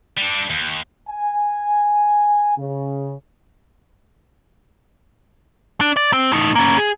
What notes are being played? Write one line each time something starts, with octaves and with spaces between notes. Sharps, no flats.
G3 D4
D#2
G#5
C#3
D4
D5
C4
A2 D#4
A#3 C#4
G#4